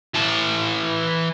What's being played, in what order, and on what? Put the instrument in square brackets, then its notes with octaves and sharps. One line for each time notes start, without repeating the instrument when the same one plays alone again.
[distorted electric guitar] E3 A5